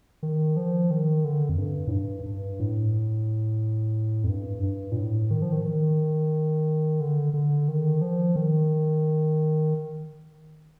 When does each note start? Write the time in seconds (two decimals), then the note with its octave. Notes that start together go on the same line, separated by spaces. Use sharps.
0.23 D#3
0.57 F3
0.91 D#3
1.25 D3
1.49 F2
1.58 G2
1.87 A2
1.92 G2
2.26 G2
2.60 A2
4.24 F2
4.29 G2
4.63 G2
4.92 A#2
4.97 A2
5.31 D#3
5.42 F3
5.53 D#3
5.65 D#3
7.01 D3
7.34 D3
7.68 D#3
8.01 F3
8.36 D#3